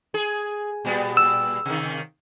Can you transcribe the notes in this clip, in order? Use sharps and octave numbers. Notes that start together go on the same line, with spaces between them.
G#4
A#2 G3 B3
E6
C3 D#3